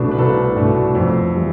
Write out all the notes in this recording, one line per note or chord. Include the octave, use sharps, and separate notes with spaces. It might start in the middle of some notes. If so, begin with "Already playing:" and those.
Already playing: C2 B2 A3 D4 B4
B4
C2 A4
B2 A3 D4
F2
E3 G3